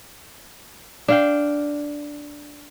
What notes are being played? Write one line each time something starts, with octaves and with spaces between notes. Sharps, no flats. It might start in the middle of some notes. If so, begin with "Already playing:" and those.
D4 F5 G5